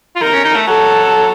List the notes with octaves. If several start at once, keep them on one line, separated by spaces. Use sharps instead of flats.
F4
D#4 A#4
C#4
D#4
A3
F#3 A4